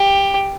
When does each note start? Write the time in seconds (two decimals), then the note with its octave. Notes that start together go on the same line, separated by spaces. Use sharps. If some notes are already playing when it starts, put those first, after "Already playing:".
Already playing: G4